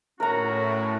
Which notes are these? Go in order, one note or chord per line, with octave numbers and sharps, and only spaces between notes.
A2 C#4 F#4 A#4 A#5